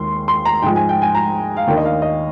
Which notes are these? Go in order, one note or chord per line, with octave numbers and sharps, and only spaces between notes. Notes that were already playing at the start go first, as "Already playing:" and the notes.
Already playing: D#2 D#3 G#3 C6
C6
A#5
G#2 F3 G#3 G5
G#5
G5
G#5
A#5
F5
D#2 D#3 A#3 D4 G5
D#5
F5
D#5